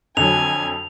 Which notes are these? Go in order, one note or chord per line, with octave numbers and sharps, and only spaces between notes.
F2 D3 F#3 G#5 F7